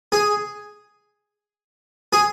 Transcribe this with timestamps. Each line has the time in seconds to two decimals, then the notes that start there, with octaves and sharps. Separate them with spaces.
0.12 G#4
2.13 G#4